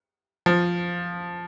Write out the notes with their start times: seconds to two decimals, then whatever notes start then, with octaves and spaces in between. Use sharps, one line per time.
0.46 F3